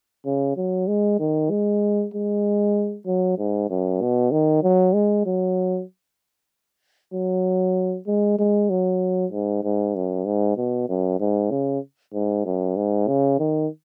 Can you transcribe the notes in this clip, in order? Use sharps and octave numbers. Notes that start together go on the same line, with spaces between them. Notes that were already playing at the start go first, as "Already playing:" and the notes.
C#3
F#3
G#3
D#3
G#3
G#3
F#3
G#2
F#2
B2
D#3
F#3
G#3
F#3
F#3
G#3
G#3
F#3
G#2
G#2
F#2
G#2
B2
F#2
G#2
C#3
G#2
F#2
G#2
C#3
D#3